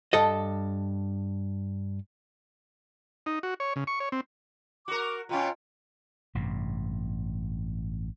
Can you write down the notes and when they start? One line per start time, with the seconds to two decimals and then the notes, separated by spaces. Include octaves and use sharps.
0.13 G2 A4 D#5
3.26 D#4
3.43 F#4
3.60 C#5
3.76 C#3
3.87 C#6
4.00 C#5
4.12 C4
4.88 F#4 A#4 D6
5.29 B2 B3 C#4 F4 G5 A#5
6.35 A1 G2 C3